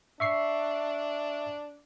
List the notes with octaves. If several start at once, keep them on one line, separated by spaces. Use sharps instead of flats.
D4 E5 C#6 C7